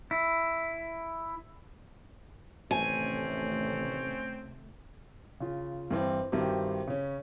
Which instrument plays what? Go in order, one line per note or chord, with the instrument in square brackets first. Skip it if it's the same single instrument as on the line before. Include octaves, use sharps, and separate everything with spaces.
[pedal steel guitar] E4
[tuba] A1 [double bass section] C3 D#3 A3 [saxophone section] C4 C#4 [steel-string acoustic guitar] G#5
[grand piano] C#3 F4
G2 E3 C4
G2 D#3 C4 E4 F#4 G4
C#3 C#4